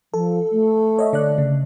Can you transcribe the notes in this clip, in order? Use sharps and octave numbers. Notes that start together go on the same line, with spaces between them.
F3 A4
A3
C#5 D#5 E5
D3 D5 F#6
C#3